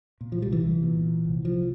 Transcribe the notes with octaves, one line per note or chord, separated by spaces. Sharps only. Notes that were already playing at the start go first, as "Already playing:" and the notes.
A#2
F3
C2 G3
E3
C2
A#2
A#2
C2
C2 F3